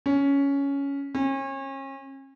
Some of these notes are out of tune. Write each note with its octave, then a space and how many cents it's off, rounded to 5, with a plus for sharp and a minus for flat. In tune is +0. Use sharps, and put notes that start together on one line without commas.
C#4 +10
C#4 -35